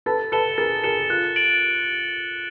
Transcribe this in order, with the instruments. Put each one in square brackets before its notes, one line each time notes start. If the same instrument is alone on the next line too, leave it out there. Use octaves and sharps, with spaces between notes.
[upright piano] A4 B4 [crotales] A6
[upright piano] A4 B4 [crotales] C#7 E7 G7
[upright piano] G#4 A#4 [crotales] A6
[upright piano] G#4 A#4 [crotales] C#7 E7 G7
[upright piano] F4 [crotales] F#6
[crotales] A6 D7 F#7